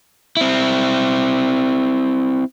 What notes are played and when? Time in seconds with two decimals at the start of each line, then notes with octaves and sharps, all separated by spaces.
0.37 C4 E4